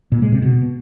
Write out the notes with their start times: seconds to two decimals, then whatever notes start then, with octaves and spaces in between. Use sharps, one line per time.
0.12 A#2
0.22 G#3
0.32 C3
0.42 B2